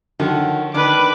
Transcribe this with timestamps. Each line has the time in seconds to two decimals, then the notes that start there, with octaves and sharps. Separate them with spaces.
0.20 D3 D#3 F3 F#3
0.74 D#3 D4 B4 D6